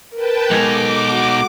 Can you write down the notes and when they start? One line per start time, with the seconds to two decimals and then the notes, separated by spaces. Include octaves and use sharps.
0.15 A#4 B4 G5 A5
0.51 B2 G#3 D#4 A4 D6 G#6
1.10 F#4